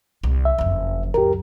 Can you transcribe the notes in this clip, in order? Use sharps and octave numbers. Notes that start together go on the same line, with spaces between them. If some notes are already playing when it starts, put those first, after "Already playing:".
C2
E5
F#1 F2
C#2 F#2 G4 A#4